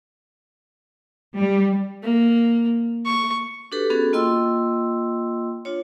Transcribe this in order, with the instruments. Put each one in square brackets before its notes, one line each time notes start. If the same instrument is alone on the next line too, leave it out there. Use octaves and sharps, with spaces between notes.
[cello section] G3
[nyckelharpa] A#3
C#6
[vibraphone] D4 F#4 G4 A4 B4
B3 C#4 F#4 G#4 A4
A#3 F4 D#5 G5 C6 E6
D4 F4 C#5